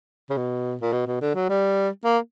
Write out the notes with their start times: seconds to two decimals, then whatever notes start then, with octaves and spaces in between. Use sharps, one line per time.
0.30 C#3
0.37 B2
0.81 A#2
0.92 B2
1.07 B2
1.21 D3
1.35 F#3
1.49 G3
2.05 A#3